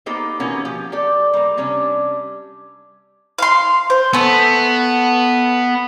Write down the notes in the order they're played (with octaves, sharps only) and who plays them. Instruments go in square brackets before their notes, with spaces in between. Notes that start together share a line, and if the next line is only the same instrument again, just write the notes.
[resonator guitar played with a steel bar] A#3 B3 D#4 G4 A4 C5
B2 D#3 E3 A#3 B3 C#4
F3 G4
G4 A4 D5
G3 A#3
C3 G3 C#4 D4
[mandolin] F5 C6
C5
[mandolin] A3 A4 [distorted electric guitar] B3